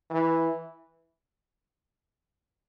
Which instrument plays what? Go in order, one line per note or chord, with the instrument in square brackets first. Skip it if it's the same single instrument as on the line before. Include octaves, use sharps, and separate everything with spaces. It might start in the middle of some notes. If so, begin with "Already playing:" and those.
[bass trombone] E3